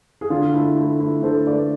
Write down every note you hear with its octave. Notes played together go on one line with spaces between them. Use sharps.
G#4
D3 F4
A3 E4
A3 E4
A3 E4
D3 A4 C5
A3 B4 D5